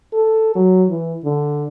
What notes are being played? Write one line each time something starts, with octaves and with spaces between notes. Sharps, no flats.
A4
F#3
E3
D3